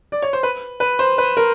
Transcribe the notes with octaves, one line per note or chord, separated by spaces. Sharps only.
D5
C#5
C5
B4
B4
C5
B4
A#4